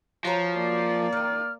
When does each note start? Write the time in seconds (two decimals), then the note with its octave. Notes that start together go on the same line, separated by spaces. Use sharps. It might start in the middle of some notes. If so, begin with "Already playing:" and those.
0.25 F3 F#4 C#5 A#5
0.56 A#3 D5 C7
1.13 D#3 F4 F6